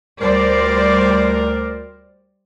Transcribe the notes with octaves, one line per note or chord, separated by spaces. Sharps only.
D2 G3 A#4 C5 D5